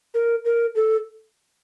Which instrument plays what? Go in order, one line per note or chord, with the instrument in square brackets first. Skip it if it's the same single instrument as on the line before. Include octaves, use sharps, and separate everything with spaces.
[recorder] A#4
A#4
A4